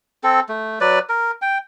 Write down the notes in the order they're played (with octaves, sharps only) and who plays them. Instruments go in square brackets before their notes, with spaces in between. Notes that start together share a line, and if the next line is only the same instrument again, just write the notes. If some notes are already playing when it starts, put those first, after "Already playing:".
[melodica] C4 A4
A3
F#3 B4 D5
A#4
G5